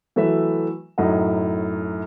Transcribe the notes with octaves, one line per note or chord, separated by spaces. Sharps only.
E3 F#3 A3 B4 E5
F#2 A2 D#4 D#5 F#5